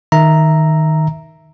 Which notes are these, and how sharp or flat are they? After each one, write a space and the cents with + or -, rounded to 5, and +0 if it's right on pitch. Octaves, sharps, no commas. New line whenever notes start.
D#3 +0 E5 +0 A#5 +0